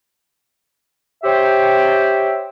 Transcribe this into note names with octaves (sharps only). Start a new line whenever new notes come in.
G4 C5 C#5 E5 G5